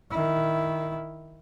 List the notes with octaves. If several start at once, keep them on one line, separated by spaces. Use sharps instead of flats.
D#3 E4